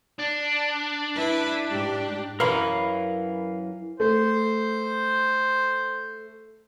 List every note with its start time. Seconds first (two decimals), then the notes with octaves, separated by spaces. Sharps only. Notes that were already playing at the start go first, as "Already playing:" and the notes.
0.19 D4
1.16 E4 B4
1.71 G#2 G4
2.40 F#2 E3 A#4 F5 B5
4.00 A3 C5